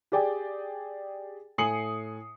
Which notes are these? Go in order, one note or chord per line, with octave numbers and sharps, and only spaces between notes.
G4 G#4 D5 G5 G#5
A2 G#5 D#6 C7 C#7 F#7